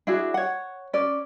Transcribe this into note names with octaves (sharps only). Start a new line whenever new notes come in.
D4 E4 F#4 G#4
C#5 F#5
C#4 D5